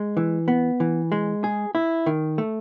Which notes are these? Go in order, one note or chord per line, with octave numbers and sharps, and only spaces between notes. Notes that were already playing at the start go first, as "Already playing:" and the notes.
Already playing: G#3
E3
B3
E3
G#3
G#4
E4
D#3
A3